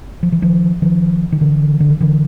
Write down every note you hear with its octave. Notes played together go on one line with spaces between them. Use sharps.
F3
E3
D#3 F3
D#3 F3
D#3
D3 E3
D3
D#3
D3 E3